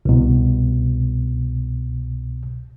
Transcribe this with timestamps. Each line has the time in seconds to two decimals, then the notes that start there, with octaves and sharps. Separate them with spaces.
0.05 C2 B2